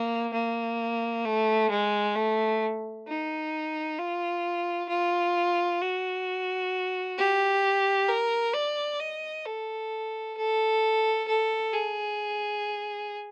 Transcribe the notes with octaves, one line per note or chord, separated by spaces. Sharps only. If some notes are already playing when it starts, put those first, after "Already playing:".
Already playing: A#3
A#3
A3
G#3
A3
D#4
F4
F4
F#4
G4
A#4
D5
D#5
A4
A4
A4
G#4